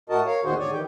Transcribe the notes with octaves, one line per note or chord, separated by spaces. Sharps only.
A2 F#4 A#4 D#5 A5
A#4 C#5 F5
E2 A#2 D#3 F#4 G#4 C5
G#2 D3 G#4 C#5 D5 G#5
D#3 E3 G4 G5